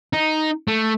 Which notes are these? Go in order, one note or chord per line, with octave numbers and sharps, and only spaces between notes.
D#4
A3